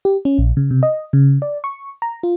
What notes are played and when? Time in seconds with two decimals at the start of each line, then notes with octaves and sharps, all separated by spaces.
0.05 G4
0.25 C#4
0.38 A#1
0.57 C#3
0.71 C3
0.83 D#5
1.13 C#3
1.42 D5
1.64 C#6
2.02 A#5
2.23 F4